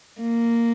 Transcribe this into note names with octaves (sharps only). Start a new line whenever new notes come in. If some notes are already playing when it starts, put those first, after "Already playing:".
A#3